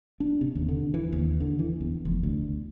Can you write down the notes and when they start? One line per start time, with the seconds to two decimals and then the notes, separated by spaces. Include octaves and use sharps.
0.20 D4
0.41 C3
0.55 D#2
0.69 D3
0.94 E3
1.12 D#2
1.40 D3
1.59 E3
1.81 E2
2.05 F1
2.23 D2